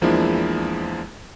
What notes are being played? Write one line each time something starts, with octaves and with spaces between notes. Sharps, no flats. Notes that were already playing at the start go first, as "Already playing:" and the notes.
E2 F3 G#3 A#3 D4 E4